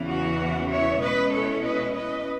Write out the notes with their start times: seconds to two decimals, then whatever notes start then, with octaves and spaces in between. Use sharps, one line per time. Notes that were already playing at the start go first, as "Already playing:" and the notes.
Already playing: E2 C#3 E3
0.09 F#4
0.71 C#5 E5
1.02 B2 G#3 C#4 E4 B4 D#5
1.33 A4 C#5
1.64 B4 D#5
1.95 B4 D#5